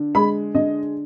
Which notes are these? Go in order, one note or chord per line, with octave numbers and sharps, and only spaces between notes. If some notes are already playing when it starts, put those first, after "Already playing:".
Already playing: D3
G#3 B5
D3 D#5